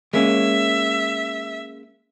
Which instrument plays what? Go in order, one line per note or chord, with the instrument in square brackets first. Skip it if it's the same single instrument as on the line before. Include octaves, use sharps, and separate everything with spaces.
[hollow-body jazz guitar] G#3 A#3 C#4 [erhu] E5